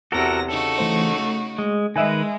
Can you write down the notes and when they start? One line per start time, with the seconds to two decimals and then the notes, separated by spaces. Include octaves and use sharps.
0.12 E2 C3 F#4 A4 A#4 A#6
0.48 C#3 D#4 F#4 A4
0.78 E3 A3 C5
1.18 A3
1.58 G#3
1.96 D#3 G#3 B4 D#5 E5 G#5